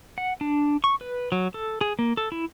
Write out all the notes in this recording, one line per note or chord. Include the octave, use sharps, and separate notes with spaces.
F#5
D4
C#6
B4
F#3
A4
G#4
A#3
A4
E4